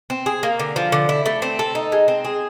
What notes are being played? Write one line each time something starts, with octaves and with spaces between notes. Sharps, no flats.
C4
G#4
A#3
D3
F3
D3
E4
A3
C4
A4
D#4
G#3
C4
G#4